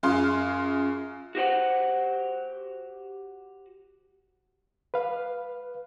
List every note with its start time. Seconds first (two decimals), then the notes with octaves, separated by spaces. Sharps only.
0.03 F#2 F4 G#4 C6
1.35 F#4 G4 C5 F#5
4.94 B4 F5